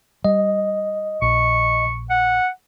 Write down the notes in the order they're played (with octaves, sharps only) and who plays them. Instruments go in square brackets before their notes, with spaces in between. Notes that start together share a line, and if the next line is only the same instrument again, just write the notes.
[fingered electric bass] G3 [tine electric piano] D#5
[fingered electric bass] A#1 [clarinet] C#6
[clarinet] F#5